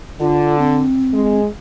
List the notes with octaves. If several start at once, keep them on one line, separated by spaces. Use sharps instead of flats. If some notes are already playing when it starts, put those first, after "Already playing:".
D3 F4
C4
G#3